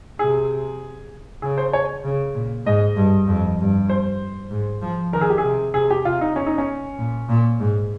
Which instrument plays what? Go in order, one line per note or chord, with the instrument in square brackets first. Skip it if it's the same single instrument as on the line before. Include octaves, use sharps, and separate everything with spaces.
[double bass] C3 [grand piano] G#4
[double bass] C#3 [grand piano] G#4
[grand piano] C5
C#5
[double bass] C#3
A#2
[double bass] G#2 [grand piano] D#5
[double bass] G2
F2
G2
[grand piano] C5
[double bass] G#2
F3
[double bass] D#3 [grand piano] A#4
[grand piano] G#4
G4
G#4
[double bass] C3
[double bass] C3 [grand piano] G#4
[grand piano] G4
[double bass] C3 [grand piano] F4
[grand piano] D#4
C#4
D#4
C#4
[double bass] A#2
A#2
G#2